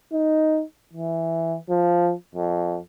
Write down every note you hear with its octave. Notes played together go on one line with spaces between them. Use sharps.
D#4
E3
F3
F2